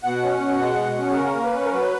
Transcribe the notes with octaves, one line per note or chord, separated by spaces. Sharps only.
B2 F#5
C#4
B2
G#3
B2
C#4
G#4
C#3 A#4
A#3
B4
C#4
A#4
F#3 B4